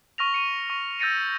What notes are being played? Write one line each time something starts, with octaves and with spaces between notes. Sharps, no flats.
C#6 F6 A#6 F7
C#7 D#7
C#6
E6 G6 A6 A#6 C#7 D#7